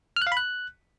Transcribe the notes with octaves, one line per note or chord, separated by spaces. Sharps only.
F6
F#6
F5
B5
F#6